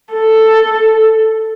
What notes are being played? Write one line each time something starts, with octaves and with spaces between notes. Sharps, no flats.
A4